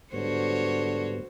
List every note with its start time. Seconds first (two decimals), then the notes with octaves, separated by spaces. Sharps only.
0.13 G#2 D3 G3 B3 F#4 C5 C#5